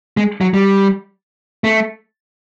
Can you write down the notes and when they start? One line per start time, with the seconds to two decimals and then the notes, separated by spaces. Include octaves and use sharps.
0.17 G#3
0.41 F#3
0.54 G3
1.64 A3